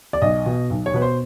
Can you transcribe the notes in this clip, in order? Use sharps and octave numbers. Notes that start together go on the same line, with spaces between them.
D5
B1 D#5
B2
B1
C#5
B2 B4
C5